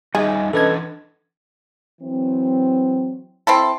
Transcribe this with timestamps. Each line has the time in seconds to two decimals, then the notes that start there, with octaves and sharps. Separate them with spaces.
0.15 G3 D#4 G#4 D#5 E5 G#5
0.53 E3 C#4 D4 A4 B4 D#5 A5 G#6
2.00 E3 F#3 C4
3.47 C4 E4 A4